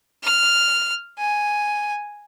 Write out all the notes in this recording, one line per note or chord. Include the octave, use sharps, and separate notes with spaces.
F6
G#5